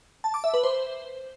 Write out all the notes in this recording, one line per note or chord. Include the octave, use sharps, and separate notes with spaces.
A5
D6
E5
B4
C5